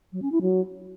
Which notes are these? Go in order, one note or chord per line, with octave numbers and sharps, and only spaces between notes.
F#3
C#4
E4
F#3